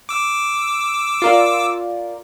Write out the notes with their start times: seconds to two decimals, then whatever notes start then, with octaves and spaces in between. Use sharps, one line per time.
0.09 D6 E6
1.22 F4 A#4 D5